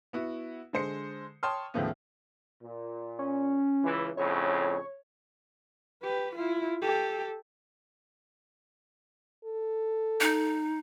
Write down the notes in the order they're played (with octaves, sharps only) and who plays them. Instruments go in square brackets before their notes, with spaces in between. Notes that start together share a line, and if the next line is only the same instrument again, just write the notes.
[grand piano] B3 E4 F#4
D3 G#3 C5 C7 C#7
C#5 G5 A5 C6 D#6 F6
D#2 A2 C#3 F3 A3 B3
[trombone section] A#2
[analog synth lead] C#4
[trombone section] C#2 E3
[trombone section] F2 A2 C#3 [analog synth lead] C#5
[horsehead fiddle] G4 B4
E4 F4
G4 A4
[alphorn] A4
[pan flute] D#4